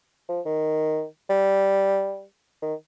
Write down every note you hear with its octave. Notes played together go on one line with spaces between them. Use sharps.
F3
D#3
G3
D#3